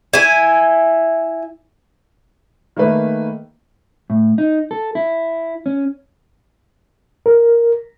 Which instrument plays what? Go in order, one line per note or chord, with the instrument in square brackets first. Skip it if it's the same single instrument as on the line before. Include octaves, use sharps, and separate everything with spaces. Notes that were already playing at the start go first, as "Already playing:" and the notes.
[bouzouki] E4 G#5
[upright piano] D#3 A3 A#3 B4
[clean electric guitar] A2
D#4
A4
E4
C#4
[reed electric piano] A#4